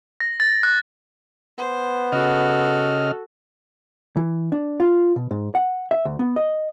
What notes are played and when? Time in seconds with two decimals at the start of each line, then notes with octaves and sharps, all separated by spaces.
0.20 A#6
0.40 A6
0.63 F#6
1.58 B3 C5
2.12 C#3 F#4 A4 D#5 F6
4.17 E3
4.52 D4
4.80 F4
5.16 B2
5.31 G#2
5.55 F#5
5.91 E5
6.05 D2
6.19 B3
6.36 D#5